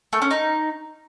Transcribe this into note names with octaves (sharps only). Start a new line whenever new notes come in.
A3
C#4
D#4